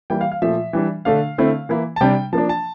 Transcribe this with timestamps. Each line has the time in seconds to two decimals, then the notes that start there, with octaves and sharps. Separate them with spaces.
0.10 E3 G3 A#3 E4 G5
0.21 F5
0.32 F5
0.42 A#2 F3 A3 E5
0.73 E3 G3 D4
1.05 D3 A3 D4 F5
1.38 D3 A3 C4 E4
1.69 E3 A#3 E4
1.96 A5
2.01 C3 G3 D4 G5
2.33 F3 A#3 D4 A5
2.49 A5